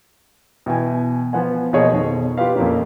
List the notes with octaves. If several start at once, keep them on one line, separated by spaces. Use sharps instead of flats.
B2 E3 G5 G#5
F3 B3 F#5 G#5
B2 F3 A#3 G#4 C#5 D#5
F2 B2 D#3
F4 G4 B4 F5
F2 A#2 A#3 C#4